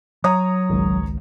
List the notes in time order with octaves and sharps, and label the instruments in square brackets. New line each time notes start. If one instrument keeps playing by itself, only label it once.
[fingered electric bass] F#3 [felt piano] C#5 A#5 D#6
[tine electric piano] G#1 C#2